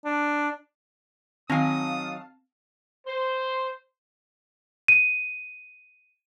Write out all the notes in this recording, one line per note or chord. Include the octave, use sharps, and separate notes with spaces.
D4
D#3 F#3 C4 F5 G#5 A5 D#6
C5
D#7